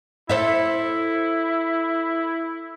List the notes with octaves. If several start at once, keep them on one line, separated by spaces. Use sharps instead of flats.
E4 A4 C5 E5